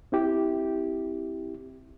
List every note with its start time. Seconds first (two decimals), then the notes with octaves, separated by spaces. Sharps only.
0.12 C4 E4 G4